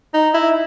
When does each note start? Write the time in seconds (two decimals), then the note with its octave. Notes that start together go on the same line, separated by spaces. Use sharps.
0.14 D#4
0.34 E4